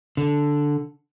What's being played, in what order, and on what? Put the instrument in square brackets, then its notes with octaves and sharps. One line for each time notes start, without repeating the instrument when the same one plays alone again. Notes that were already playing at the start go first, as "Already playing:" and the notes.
[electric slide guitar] D3